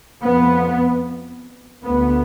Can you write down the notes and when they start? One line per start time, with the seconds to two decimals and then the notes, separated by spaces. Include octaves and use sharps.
0.24 F2 B3
1.84 D2 B3